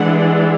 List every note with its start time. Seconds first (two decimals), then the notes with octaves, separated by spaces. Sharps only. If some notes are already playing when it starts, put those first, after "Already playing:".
Already playing: E3 G#3 D4 F#5